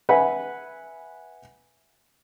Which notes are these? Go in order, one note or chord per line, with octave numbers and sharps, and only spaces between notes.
B4 E5 F#5 G#5 B5